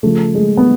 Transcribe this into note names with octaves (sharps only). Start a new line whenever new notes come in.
C#3 F3 A3
G#3
B3